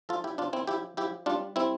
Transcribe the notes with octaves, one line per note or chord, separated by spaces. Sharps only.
F3 F4 A4
E4 G4
C3 D4 F4
C4 E4
F3 E4 G4
F3 E4 G4
G3 D4 F4
G3 C4 E4